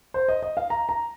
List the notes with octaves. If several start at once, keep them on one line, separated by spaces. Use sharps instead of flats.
C5
D#5
D#5
F5
A#5
A#5